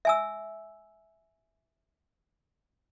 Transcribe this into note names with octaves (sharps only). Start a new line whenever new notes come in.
E5 G#5 E6